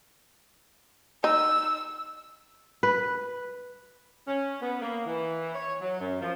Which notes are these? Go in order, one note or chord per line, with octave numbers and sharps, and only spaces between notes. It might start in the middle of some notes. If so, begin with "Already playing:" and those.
D#4 E6
B4
C#4
B3
A#3
E3
C#5
F#3
F#2
F3